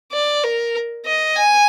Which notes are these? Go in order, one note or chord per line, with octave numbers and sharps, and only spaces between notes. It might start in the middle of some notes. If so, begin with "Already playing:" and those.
D5
A#4
D#5
G#5